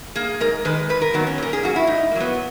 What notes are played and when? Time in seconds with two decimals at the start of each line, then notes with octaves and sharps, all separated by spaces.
0.15 A#3 G#4
0.40 G#2 A#4
0.65 D#3 G#3 B4
0.89 G#2 B4
1.02 A#4
1.14 D#3 F#3 A#3 B3
1.27 C#4
1.38 A#2 A#4
1.53 G#4
1.63 F#3 A#3 F#4
1.76 E4
1.87 G#2 D#4
2.12 A#3
2.15 F#3
2.20 B3